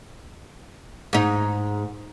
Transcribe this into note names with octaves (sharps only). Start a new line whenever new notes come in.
G#2 D#4